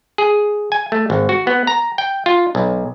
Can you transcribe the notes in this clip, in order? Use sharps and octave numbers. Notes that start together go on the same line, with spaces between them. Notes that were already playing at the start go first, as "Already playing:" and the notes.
G#4
G#5
A3
G#1
F#4
B3
A#5
G5
F4
B1